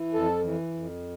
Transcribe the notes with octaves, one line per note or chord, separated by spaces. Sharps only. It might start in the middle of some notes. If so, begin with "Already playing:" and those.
Already playing: E3
F2 A4
E3
F2